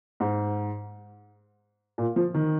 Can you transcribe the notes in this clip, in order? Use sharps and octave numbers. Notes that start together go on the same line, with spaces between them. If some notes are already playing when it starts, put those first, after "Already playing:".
G#2
A#2
F3
D#3